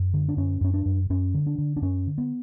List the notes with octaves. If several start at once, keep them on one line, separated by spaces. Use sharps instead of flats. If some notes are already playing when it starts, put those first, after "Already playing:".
Already playing: F#2
D3
D4
F#2 C#4
F#2 C#4
D4
F#2
F#2 C#4
D3
D4
D3
D4
F#2 C#4
D3
B3